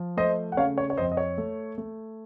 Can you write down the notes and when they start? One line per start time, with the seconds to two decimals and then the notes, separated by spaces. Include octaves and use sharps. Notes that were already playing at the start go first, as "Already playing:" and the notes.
Already playing: F3
0.17 A3 C5 D#5
0.52 F#5
0.57 C#3 C#5 F5
0.78 C#5
0.90 C#5
0.97 F2 C5 D#5
1.12 D#5
1.17 C#5
1.38 A3
1.78 A3